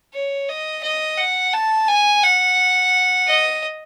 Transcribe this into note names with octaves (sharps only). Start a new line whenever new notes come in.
C#5
D#5
D#5
F#5
A5
G#5
F#5
D#5